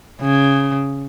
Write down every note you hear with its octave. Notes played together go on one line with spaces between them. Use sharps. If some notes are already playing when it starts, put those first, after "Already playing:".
C#3